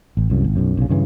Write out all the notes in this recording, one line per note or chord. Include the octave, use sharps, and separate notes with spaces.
A1
C2 F#2
G#1
B1 F#2
B1 C#3
G2 C#3 E3